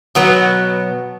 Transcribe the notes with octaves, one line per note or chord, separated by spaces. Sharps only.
B2 F#3 B3